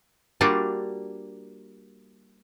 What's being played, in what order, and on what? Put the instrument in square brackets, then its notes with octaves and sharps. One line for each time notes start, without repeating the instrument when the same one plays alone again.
[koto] G3 A#3 D4 F4 F#4